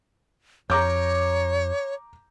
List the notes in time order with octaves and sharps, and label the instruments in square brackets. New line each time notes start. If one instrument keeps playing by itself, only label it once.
[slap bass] F2 [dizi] C#5 [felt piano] A#5 D6 G6